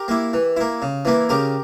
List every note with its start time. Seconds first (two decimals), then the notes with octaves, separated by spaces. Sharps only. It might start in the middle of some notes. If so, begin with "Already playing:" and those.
Already playing: G4 A#4
0.08 A#3 E4
0.33 E3
0.57 A#3 E4
0.82 C#3
1.05 E3 A#3 E4
1.29 C#3 G4 A#4